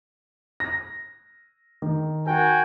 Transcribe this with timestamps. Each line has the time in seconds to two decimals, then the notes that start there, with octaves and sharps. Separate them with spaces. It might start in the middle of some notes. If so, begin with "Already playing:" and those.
0.60 A#6
1.82 D#3
2.27 F#4 A#4 G5 G#5